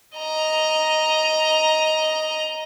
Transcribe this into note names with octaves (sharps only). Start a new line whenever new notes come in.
D#5 A#5